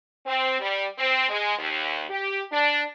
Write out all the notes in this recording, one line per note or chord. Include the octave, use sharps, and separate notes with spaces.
C4
G3
C4
G#3
D#2
G4
D4